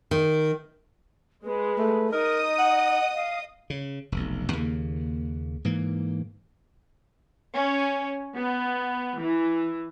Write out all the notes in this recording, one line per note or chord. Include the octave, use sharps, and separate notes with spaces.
D#3
G#3 B4
A3
D#4 A#4 D#5 D#6
F#5
F5
C#3
F1 B1
D#2 C#3 A#3
G#2 E3 A#3
C#4
B3
E3